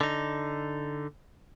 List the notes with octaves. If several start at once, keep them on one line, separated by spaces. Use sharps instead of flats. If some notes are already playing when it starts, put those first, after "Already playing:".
D3 D#4